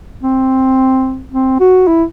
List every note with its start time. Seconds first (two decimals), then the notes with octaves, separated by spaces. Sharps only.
0.23 C4
1.32 C4
1.60 F#4
1.87 E4